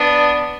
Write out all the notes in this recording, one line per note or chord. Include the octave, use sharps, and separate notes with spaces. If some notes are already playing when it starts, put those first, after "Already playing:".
Already playing: B3 D4